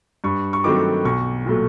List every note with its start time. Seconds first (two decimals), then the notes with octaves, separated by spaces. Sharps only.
0.24 G2 C#6
0.53 C#6
0.64 D#3 F#3 A3 C4 D6
1.05 B1 C#6
1.46 A#2 F#3 A3